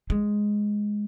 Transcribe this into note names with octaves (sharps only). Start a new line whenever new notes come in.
G#3